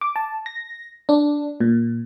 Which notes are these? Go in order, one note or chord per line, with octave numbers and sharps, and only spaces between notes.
D6
A5
A#6
D4
A#2